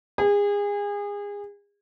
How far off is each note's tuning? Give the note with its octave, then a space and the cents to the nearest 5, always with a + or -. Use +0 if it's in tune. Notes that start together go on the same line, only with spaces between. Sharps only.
G#4 -30